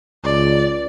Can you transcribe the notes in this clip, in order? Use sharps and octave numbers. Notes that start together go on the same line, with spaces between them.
C#2 D5